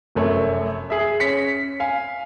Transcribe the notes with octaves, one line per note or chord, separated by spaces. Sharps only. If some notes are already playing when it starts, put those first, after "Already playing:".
F1 F#2 A3 C#5
G#4 E5
C#4 B6 C#7
F5 G#5